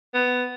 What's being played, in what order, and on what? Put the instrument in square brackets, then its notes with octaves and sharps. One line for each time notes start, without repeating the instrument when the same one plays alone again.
[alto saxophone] B3